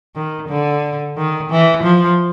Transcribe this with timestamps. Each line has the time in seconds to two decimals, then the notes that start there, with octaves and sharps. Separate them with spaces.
0.16 D#3
0.49 D3
1.17 D#3
1.50 E3
1.83 F3